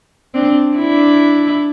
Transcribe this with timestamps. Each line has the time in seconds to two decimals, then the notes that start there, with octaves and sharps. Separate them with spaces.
0.34 C4 D4
0.76 D4 E4